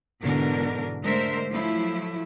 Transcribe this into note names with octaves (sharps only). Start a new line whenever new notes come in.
G#2 B2 D3 E3 D4 A#4
D3 G#3 A3 A#4 C5 E5
F3 F#3 A3 E4